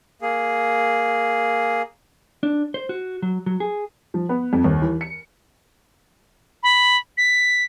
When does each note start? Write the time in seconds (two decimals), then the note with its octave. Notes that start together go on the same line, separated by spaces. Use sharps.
0.22 A#3 G#4
2.43 D4
2.74 C5
2.89 F#4
3.22 F#3
3.46 F#3
3.60 G#4
4.14 F3
4.29 B3
4.53 F2
4.64 D#2
4.82 E3
5.01 C#7
6.63 B5
7.17 B6